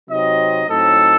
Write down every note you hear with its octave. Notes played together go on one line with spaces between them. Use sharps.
C3 F#3 C4 D#4 D#5
A2 F#3 C4 D#4 A4